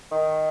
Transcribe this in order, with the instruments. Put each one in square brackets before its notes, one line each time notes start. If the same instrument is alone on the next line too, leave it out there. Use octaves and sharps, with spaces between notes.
[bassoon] D#3